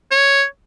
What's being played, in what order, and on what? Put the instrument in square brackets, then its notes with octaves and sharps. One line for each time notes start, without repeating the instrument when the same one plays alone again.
[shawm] C#5